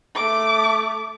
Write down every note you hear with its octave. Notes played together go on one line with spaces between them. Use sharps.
A3 D6